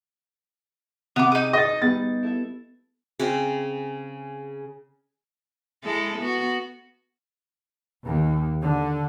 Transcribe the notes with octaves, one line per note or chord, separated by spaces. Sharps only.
C3 B3 D6
D#4 G#4 D#6
D#5 A6
G3 B3 A6
E4 A4 E5
C#3 C4
G#3 E4 A4
B3 F#4
D#2
D3